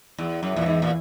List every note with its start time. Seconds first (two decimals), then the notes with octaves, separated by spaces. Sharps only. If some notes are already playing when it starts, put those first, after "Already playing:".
0.18 E2
0.43 F#2
0.54 E2 A#2 E3
0.66 G#2
0.82 A#2